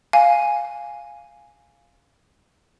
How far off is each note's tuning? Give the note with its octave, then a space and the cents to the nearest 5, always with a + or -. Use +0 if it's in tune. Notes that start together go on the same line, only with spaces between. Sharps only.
F5 +0 G#5 +0